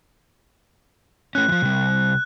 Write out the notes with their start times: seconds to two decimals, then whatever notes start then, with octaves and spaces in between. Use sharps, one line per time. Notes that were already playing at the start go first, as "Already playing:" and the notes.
1.35 A3 C#4 F#6
1.49 E3 F3
1.62 C3 G3